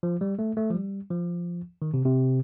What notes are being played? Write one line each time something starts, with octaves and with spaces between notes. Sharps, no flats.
F3
G3
A3
A3
F3
G3
F3
D#3
C3
C3